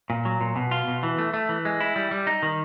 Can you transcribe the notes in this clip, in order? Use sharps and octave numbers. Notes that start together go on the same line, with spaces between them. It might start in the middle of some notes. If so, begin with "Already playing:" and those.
A#2
F#3
A#2
B2
F4
B2
E3
A3
A3
E3
G#3
E4
G3
G3
D#4
D#3